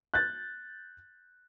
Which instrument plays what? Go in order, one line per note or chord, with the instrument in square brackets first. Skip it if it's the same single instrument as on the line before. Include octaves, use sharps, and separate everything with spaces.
[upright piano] F#6 G6 A6